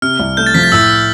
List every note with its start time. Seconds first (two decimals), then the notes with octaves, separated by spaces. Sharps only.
0.02 C3 F6
0.19 C2
0.37 A3 G6
0.47 A6
0.54 F3 B6
0.64 A6
0.72 A2 E6